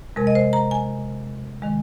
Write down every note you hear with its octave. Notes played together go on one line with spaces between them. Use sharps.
F2 C3 G#3 A#4
D#5
C5
A#5
G#5
D#3 G#3